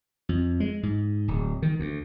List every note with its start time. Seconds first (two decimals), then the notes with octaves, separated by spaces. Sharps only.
0.29 F2
0.60 G#3
0.83 G#2
1.28 D1
1.62 D#3
1.80 D2